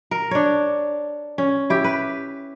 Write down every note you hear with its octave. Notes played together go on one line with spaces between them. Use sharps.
A#4
D4 C#5
C#4
E4 G4
B4